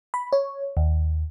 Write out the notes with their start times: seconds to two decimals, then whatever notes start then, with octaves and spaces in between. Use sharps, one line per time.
0.14 B5
0.33 C#5
0.77 D#2